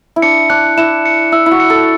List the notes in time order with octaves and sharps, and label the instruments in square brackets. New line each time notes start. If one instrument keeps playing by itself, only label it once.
[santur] E4
[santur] D4 [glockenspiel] C#7
[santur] D4 [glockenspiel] F#6
[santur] E4 [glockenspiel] E7
[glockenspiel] C#7
[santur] E4 [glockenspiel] E6
[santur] E4
F#4
[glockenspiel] C#7
[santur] A4